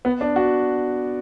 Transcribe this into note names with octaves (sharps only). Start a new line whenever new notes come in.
B3
D4
F#4